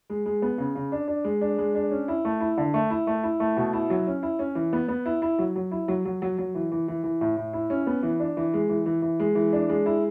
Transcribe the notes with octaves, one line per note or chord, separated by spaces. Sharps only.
G#3
G#3
B3
C#3
C#3
D4
D4
G#3
D4
G#3
D4
C#4
E4
A3
E4
D3
A3
E4
A3
E4
A3
B2
E4
F#3
C#4
E4
C#4
E3
B3
B3
E4
E4
F#3
F#3
E4
F#3
F#3
F#3
F#3
E3
E3
E3
E3
A2
A2
E4
C#4
B3
E3
D4
E3
G#3
E3
E3
E3
G#3
E3
D4
G#3
E4